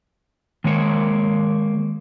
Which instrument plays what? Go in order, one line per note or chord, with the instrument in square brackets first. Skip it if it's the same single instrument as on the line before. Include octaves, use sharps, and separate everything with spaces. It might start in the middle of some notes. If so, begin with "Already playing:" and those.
[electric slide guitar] D#3 G#3 A#3 C#5